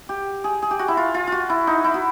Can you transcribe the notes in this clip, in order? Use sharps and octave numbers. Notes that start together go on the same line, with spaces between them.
G4
G#4
G#4
G4
F#4
E4
F4
F4
F4 F#4
E4
D#4
E4
F#4